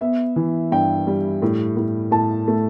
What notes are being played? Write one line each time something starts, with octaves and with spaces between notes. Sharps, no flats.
B3 E5
E3
G2 G5
G3
A2
A2
A2 A5
A3